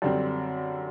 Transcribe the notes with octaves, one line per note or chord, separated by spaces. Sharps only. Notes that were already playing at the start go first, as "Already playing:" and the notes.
F#2 D3 G3 C4